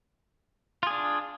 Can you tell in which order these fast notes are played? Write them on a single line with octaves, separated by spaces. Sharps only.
F4 G#4 D4